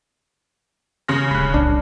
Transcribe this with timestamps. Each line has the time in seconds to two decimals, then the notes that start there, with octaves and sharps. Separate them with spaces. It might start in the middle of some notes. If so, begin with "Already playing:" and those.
1.08 C#3 F6 A#6
1.31 D1 D3 B5 F#6
1.54 C2 D4